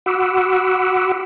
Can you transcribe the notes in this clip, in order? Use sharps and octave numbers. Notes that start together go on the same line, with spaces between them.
F#4 F#5 B5 C#6 D6 E6